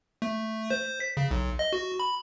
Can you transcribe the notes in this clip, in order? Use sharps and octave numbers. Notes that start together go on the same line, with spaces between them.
A3
C5
B6
C#3
B1
D#5
F#4
B5